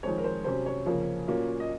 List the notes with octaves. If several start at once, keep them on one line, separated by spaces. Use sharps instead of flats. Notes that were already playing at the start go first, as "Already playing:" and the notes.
F2 D#3 G#3 C4 C#5
A#4
C5
C3 F#3 C#4 C5
C#5
F2 C#3 F3 A#3
A#2 F#3 A#3 C#4
D#5